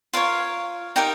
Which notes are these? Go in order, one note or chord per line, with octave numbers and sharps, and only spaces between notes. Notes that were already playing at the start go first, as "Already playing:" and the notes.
F4 A#4 C#5 F5
D#4 G4 A#4 G5